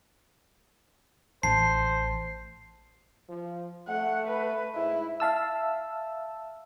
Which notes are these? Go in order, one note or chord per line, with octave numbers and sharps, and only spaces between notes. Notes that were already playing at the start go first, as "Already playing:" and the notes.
A1 C5 A5 C7
F3
A3 F#5
B4
G#2 E4
E5 F5 A5 E6